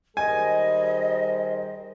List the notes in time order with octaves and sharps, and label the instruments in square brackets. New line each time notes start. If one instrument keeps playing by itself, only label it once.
[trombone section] D#3 G3 [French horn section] G#4 A#4 C5 [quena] D#5 [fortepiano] G#5